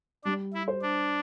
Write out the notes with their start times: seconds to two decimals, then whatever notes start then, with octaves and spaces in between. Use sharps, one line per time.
0.24 G3 D4
0.54 E4
0.68 C5
0.81 D4